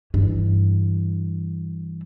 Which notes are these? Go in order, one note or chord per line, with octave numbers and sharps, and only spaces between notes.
G2 E3